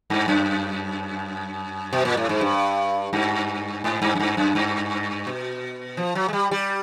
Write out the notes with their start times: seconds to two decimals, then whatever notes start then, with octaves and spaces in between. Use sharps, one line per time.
0.10 G2
0.28 F#2
1.93 B2
2.05 A#2
2.17 A2
2.29 G#2
2.41 G2
3.13 G2
3.84 G#2
4.02 G2
4.15 F#2
4.20 G2
4.37 F#2
4.55 G2
5.27 B2
5.97 F3
6.15 F#3
6.28 G#3
6.33 G3
6.51 G3